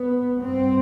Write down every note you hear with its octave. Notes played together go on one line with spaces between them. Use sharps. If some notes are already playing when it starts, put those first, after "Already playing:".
Already playing: B3
G2 C4